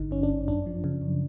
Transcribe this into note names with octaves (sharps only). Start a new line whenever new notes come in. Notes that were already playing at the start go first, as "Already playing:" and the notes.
Already playing: G#1 D3 D#4
G2 C#4
D4
G#1
F#2 D4
F3
C#3
F#2